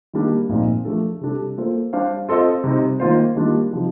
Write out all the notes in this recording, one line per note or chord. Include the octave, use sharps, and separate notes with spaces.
D#3 G3 A#3 D4
A#2 F3 C4 D#4
F3 A3 D4 A4
C3 G3 D4 A4
A#3 F4 A4 C5
G3 D4 G4 C5 F5
C4 F4 A4 C5 D#5
C3 G3 C4 D#4
D#3 A#3 F4 C5
D#3 G3 A#3 D4 F4
C3 F3 C4 D#4